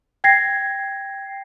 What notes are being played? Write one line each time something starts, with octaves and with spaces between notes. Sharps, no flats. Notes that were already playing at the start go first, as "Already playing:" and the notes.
G5 G#6 A#6 C7